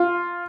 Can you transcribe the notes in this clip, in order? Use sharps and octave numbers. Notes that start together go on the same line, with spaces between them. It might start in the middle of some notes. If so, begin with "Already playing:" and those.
Already playing: F4